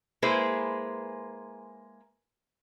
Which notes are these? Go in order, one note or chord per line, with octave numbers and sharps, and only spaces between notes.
G#3 A#3 E4 G#4 B4 C5